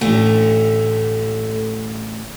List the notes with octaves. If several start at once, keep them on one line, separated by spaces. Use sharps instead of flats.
A1 D2 A3